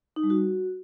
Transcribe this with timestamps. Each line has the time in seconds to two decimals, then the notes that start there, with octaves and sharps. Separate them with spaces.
0.16 D#4
0.23 G3
0.30 F#4